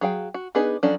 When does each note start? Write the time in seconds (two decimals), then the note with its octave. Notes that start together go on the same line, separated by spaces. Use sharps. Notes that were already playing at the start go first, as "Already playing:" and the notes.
0.01 F#3 G#4 F5 G5
0.34 F#4
0.55 B3 D4 D#4 G#4 B4
0.83 F3 F#3 C#4 D4 A4